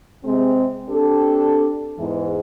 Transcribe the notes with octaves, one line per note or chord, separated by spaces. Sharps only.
C3 G#3 C4
C4 D4 G4 A4
E2 G#2 E3